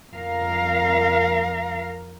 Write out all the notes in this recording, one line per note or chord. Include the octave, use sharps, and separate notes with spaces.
F2 A#4 F5